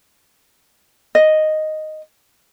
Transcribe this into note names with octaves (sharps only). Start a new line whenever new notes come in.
D#5